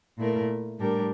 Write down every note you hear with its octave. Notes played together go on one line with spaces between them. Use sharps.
A#2 A3 E4 A#4
A2 G3 D4 G4 A#4